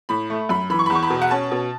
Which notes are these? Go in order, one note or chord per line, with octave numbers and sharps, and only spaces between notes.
A2 B5
A3
F#2 B5
E3 B5
C#6
B5
E2 C#6
B5
B2
F#5
C#4 A5
B2